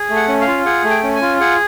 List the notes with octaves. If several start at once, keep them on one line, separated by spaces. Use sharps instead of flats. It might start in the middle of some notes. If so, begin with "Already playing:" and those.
Already playing: G#4
A3
F#5
C#4
F5
F4
G#4 F#5
A3
G5
C#4
G#5
F4
G#4 F#5